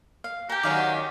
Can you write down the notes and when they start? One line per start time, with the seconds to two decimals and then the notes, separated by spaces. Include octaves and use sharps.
0.24 F5
0.49 G4 G5 A#5
0.63 D#3 F#3 C#4 D5 F5 F#5